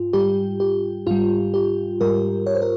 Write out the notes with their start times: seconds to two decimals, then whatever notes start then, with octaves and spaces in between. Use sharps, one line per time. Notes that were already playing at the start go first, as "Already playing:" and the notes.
Already playing: G#2 F4
0.13 G#2 G3 G4
0.60 G4
1.07 G#2 G3 F4
1.54 G4
2.01 G#2 G3 A#4
2.47 C#5
2.55 C5
2.62 A#4